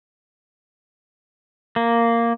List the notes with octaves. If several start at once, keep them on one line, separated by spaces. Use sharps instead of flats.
A#3